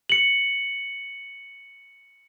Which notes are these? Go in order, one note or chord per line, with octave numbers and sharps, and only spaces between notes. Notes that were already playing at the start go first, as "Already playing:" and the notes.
C#7 F#7